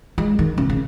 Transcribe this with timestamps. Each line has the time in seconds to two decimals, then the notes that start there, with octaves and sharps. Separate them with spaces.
0.18 G#3
0.39 D#3
0.58 C#3
0.70 C#3